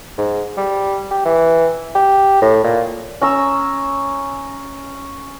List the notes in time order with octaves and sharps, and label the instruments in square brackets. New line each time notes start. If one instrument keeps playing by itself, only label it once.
[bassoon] G#2
G3
G4
E3
G4
A2
A#2
[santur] C#4 A#5 E6